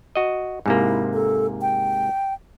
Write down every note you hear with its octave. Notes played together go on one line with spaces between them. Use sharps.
F#4 D#5
G#2 C3 A#3 E4
A4
G5